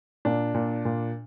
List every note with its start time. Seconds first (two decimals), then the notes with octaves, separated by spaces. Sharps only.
0.25 A#2 D4
0.54 A#2
0.85 A#2